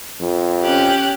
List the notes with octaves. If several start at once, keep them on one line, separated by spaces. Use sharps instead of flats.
F2
C#4 G4 F#6